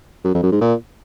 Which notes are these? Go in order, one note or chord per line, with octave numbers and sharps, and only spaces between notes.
F#2
F2
F#2
G#2
A#2